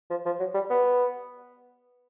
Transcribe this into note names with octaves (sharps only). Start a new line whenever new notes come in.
F3
F3
F#3
G3
B3